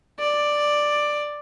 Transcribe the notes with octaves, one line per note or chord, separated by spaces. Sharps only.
D5